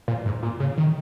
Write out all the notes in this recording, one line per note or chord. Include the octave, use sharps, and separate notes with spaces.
A#2
G#2
A#2
C#3
D#3